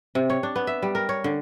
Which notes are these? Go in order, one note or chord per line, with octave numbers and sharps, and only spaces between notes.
C3
C#5
D4
B3
E5
G3
A#4
C#5
D3